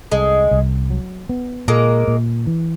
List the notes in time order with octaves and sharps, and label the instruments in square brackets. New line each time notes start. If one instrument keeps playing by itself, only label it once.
[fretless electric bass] C2 [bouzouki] G#3
[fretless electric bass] C2
F#3
B3
[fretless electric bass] A#2 [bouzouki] G#3 A#3
[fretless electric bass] A#2
E3